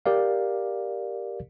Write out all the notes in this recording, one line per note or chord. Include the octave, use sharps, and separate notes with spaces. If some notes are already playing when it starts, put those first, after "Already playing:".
G4 A#4 D5 F5